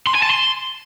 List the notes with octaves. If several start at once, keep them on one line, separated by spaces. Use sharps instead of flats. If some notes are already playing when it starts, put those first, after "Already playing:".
C6
G#5
A5
C6